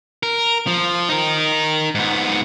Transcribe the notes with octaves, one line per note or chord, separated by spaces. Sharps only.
A#4
F3
D#4 A#4
G#2 B3